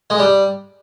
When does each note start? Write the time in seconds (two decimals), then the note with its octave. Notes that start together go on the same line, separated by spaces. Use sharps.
0.10 G#3
0.19 G3